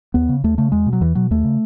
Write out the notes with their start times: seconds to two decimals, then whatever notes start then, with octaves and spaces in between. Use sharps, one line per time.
0.14 D#2 B3
0.29 C#3
0.44 D#2 A3
0.58 C#3 A3
0.72 E2 G#3
0.86 B2
0.93 F#3
1.01 E2 E3
1.15 B2 F#3
1.31 D#2 A3
1.45 C#3